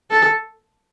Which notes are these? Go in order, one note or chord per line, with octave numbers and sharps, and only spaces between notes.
A4